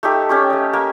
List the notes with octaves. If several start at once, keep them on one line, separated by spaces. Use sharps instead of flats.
A3 D#4 G4 A4
C#4 G4 C#6
A3 D#5
A#3